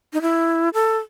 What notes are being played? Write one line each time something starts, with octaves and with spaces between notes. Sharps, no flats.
D#4
E4
A4